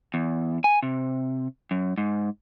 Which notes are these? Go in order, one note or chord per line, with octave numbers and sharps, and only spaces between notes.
E2
G#5
C3
F#2
G#2